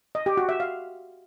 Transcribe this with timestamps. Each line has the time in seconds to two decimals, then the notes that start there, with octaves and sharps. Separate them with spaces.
0.15 D#5
0.26 G4
0.37 F#4
0.49 E5
0.60 F5